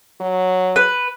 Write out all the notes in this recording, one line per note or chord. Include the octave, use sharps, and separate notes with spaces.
F#3
B4